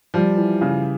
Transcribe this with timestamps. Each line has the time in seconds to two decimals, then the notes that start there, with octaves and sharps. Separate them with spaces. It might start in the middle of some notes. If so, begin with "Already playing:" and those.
0.14 F3 G3
0.37 E3
0.61 C#3